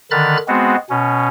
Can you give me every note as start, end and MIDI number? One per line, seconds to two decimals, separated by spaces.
0.11 0.37 50
0.11 0.37 51
0.11 0.37 83
0.11 0.37 89
0.11 0.37 90
0.11 0.37 93
0.48 0.76 56
0.48 0.76 59
0.48 0.76 60
0.48 0.76 66
0.90 1.29 47
0.90 1.29 61